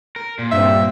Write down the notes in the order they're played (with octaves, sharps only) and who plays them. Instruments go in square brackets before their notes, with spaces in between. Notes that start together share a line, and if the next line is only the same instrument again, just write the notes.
[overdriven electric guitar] A#4
A#2
[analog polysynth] G2 C4 [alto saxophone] E5